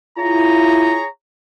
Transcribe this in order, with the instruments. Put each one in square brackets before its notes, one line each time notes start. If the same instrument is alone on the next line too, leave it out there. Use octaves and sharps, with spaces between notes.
[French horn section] E4 F4 [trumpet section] G#4 C#5 A#5